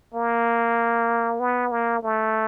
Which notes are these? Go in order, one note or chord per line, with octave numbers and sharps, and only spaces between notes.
A#3
B3
A#3
A3